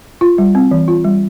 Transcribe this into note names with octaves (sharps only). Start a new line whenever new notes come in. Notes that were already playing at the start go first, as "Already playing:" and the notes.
F4
G3
C4
E3
F4
G3